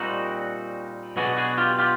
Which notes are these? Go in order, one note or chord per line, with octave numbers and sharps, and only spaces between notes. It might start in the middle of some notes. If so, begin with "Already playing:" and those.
Already playing: A#2 G3 C4 D#4 F#4
B2 F#3 B3 D4 F#4 G#4
F#4 G#4
F4 G4
F4 G4